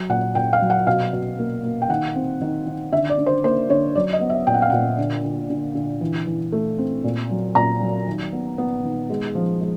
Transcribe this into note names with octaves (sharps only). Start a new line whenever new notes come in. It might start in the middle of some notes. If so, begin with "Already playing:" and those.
Already playing: F#3
A#2 F#5
A#2 G5
F5
F#3
F#5
B2 F5
B2
A#3
A#3
G5
D#3 F#5
C4
D#3
D#3
D3 E5
D5
D3
C5
A#3 C5
D3 C#5
F#3 D5
D#5
B3
E5
A#2 G5
F#5
F5
A#2 F#5
D3
D3
D3
D3
E3
E3
A3
C4
A#2
F#3
A#2 A#5
F#3
D#3
B3
B3
D#3
G#3
F3
G#3